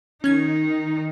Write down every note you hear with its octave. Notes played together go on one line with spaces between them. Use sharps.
D#3 C#4 D#4 G#6